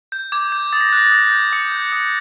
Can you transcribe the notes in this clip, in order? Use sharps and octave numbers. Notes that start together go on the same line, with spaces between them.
G6
D6 G#6
G6
D#6 A6
A#6
A6
F#6 A#6
A6
D#6 A#6
A6
G6
D#6 C#7
G6
D#6